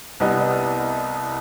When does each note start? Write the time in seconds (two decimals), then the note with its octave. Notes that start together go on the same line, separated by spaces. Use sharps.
0.20 C2 G3 B3 D#5